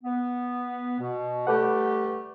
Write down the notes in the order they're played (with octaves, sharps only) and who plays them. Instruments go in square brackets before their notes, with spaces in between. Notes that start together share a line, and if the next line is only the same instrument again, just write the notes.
[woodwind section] B3
B2
[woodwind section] G3 A3 G4 [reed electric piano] A4 B4 F#5